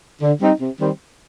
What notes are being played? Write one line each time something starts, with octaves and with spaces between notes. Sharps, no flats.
D3
G3 C4 D#4
C3
D#3 G3 C4